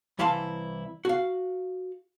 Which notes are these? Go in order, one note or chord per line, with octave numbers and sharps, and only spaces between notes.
C2 E3 E4 F5 A5 C6
F#4 F5